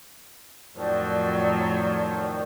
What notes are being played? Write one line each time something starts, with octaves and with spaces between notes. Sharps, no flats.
F2 A2 D#3 F3 F#3 C#5 D5